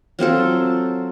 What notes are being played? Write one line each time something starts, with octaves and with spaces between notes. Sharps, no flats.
F#3 C4 F4 A4